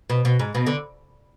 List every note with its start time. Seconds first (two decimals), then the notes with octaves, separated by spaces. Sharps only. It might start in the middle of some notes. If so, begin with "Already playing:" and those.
0.10 B2
0.25 B2
0.39 G#2
0.55 B2
0.67 D3